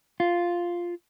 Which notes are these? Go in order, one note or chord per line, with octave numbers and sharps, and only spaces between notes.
F4